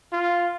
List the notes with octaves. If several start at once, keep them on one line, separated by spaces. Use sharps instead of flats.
F4